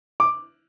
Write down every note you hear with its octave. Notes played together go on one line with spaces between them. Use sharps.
D6